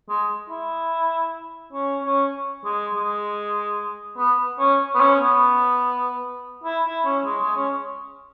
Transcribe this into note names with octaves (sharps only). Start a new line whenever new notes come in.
G#3
E4
C#4
C#4
G#3
G#3
B3
C#4
B3
C#4
B3
E4
E4
C#4
G#3
G#3
C#4